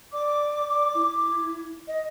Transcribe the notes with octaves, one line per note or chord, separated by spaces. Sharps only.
D5 D6
D5
E4
D#5